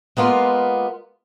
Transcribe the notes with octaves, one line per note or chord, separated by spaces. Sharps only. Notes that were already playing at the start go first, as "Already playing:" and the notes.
G#3 A#3 B3 F4